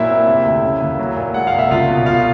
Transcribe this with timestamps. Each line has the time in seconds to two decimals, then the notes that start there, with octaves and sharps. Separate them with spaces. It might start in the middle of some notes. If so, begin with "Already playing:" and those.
Already playing: A#2 F#3 E4 E5
0.09 C4
0.27 C3
0.45 D2
0.62 C#3
0.81 D#2
0.99 F#3
1.16 A#2
1.34 G#3 F#5
1.47 F5
1.53 C2
1.59 E5
1.70 C#2 F4 F5
1.88 B2
2.06 C2 F4 F5